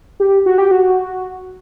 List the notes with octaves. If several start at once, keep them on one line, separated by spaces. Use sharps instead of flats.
G4
F#4
G4
F#4